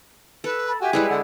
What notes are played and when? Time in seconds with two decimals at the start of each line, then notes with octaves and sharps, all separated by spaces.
0.44 A4 B4
0.66 A5 B5
0.81 F#4 G4 E5 G5 G#5
0.93 G3 G#3 E4 G#4 B4
1.10 D3 F#5